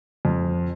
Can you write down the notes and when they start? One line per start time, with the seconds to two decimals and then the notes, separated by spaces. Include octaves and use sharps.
0.25 F2